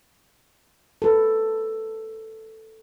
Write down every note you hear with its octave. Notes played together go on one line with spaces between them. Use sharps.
A4 B4